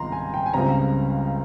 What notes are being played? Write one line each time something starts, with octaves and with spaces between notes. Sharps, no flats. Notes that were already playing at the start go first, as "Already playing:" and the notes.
Already playing: C#2 C3 D#3 G3 A#5 C6
G#5
G5
G#5
C#2 C#3 G3 C4 A#5